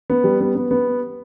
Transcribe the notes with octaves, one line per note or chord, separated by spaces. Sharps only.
B3
G3
B3
B3
B3